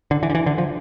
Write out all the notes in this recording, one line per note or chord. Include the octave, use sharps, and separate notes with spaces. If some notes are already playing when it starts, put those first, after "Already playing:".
D3
E3
D3
E3
D3
F3